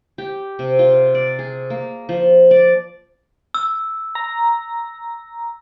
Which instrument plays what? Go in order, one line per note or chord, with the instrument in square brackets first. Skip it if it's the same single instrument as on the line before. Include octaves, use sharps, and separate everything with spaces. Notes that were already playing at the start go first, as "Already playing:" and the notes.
[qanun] G4
C3
F4
D5
G#4
A#3
F3
D5
[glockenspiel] E6
[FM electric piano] A#5